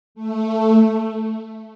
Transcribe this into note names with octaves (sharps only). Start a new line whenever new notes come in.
A3